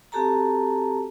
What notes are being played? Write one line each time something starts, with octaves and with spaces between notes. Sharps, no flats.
C4 F#4 G4 A4 A5 A#5